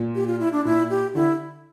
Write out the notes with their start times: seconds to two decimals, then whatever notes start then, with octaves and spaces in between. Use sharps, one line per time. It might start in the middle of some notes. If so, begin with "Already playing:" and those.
Already playing: A#2
0.15 G4
0.27 F4
0.40 E4
0.52 D4
0.65 A#2 E4
0.90 G4
1.15 D3 E4